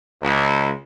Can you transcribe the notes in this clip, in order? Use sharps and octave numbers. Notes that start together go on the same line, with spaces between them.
C#2